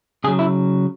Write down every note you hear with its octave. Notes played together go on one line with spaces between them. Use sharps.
C#3 F#3 G#4
E4